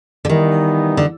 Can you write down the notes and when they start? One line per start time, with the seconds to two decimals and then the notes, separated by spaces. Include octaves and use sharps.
0.25 D3
0.29 D#3 E3 G3 B3 D#4
0.97 D3